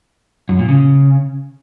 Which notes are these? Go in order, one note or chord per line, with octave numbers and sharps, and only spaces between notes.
F#2
A#2
C#3